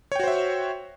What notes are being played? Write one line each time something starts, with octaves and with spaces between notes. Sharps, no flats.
F#4 C5 C#5 E5 G5